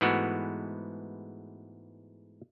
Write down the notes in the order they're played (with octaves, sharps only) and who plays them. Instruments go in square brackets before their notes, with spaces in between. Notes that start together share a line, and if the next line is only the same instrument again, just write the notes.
[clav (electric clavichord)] G#2 E3 G#3 A3 B3 F#4